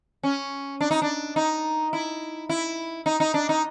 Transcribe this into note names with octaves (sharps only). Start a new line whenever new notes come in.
C#4
D4
D#4
D4
D#4
E4
E4
D#4
D#4
D4
D#4